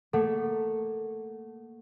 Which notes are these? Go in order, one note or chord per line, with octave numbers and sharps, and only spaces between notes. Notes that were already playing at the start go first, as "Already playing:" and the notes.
A3 A#3 A4 F#5